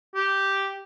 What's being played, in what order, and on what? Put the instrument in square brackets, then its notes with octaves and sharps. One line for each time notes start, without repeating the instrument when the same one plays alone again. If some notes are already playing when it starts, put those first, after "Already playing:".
[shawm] G4